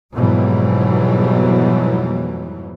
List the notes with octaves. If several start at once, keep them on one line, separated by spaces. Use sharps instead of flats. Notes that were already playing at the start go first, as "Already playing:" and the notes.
F2 G#2 B2 E3 F#3 G3